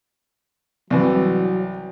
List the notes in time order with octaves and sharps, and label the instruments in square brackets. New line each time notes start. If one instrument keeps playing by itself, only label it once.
[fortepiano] C2 E3 [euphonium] F#3